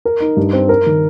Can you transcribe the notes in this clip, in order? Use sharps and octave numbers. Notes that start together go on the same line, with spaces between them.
A#4
D#4
G2
C4
A#4
D#3